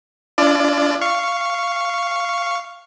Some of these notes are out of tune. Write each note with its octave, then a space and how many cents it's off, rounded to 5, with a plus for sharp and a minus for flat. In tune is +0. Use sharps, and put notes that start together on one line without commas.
D4 -35 F4 -40 D5 +25
F5 -10 C#6 +0